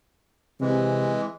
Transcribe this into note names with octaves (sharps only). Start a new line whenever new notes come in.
C3 E3 G#3